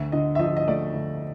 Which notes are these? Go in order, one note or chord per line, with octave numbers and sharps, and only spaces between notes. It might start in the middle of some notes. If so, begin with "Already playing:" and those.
Already playing: D2 E5
D3 D#5
E5
F3 D#5
D#5
A3 D5
D2